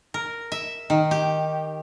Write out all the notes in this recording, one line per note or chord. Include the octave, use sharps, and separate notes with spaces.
A#4
E5
D#3
G4